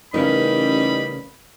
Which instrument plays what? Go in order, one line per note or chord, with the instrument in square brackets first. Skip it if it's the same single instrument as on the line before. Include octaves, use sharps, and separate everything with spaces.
[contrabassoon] A1 [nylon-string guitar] C#3 A#4 B4 [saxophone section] G3 D#4 [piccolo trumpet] B5